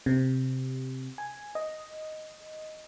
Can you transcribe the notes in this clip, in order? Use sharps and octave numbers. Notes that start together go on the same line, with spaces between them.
C3
G#5
D#5